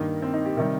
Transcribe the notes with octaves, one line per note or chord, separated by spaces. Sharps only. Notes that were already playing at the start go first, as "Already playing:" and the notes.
Already playing: G2 D#3 A#3
C4
D#4
G4
C3 D#3 G3 A#4